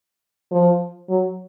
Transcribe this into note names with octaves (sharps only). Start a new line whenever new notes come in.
F3
F#3